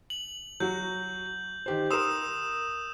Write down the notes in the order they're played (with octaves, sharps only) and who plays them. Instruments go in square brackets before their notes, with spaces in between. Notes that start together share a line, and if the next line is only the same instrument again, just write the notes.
[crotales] F#7
[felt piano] F#3 F#4 [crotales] G6
[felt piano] D#3 G4 C5
[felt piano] A#4 C6 [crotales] D#6 E6 E7